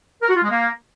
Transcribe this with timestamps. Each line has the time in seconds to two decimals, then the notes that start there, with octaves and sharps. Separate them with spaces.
0.22 A#4
0.29 F#4
0.36 F4
0.43 G#3
0.50 A#3